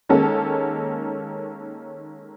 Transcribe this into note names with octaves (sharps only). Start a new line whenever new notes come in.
D#3 G#3 A#3 C#4 D#4 A4